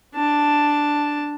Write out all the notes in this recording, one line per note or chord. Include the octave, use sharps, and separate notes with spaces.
D4 A5